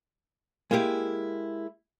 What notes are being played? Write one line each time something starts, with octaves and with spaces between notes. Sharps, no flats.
G#3 A#3 E4 G4 G#4